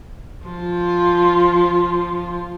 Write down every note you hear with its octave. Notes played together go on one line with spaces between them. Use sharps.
F3 F4